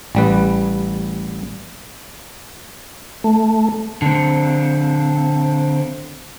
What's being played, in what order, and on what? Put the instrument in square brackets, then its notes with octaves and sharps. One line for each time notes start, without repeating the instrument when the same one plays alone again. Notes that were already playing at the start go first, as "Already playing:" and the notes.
[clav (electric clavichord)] A1 G3 B4
[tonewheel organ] A3
[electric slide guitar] D3 C4